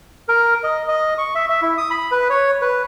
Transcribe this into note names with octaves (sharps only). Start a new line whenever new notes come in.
A#4
D#5
D#5
C#6
E5
E5
E4
D#6
B5
B4
C#5
B4